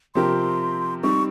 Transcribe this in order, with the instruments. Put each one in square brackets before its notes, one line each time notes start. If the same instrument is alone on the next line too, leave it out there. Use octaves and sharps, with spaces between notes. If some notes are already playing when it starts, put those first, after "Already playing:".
[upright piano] C3 F3 C4 G4 A#4 [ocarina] C6
[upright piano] G3 C4 D#4 [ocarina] C#6